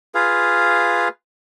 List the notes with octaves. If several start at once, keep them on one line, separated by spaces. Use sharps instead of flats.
F4 G#4 B4 F5